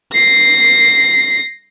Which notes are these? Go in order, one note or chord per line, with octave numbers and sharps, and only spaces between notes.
A#6 C7